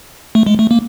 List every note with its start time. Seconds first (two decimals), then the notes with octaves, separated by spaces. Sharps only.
0.35 A3
0.46 G#3
0.59 A3
0.71 A#3